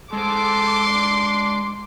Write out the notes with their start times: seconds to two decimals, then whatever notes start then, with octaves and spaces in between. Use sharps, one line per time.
0.13 G#3 A4 C5 C6 D6
0.87 D4